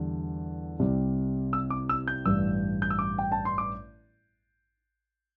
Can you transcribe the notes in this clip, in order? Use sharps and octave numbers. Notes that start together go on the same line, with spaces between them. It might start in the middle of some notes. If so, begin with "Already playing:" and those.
Already playing: E2 D3 G3
C2 C3 G3
E6
D6
E6
G6
A1 G2 G3 E6
G6
E6
D6
G5
A5
C6
D6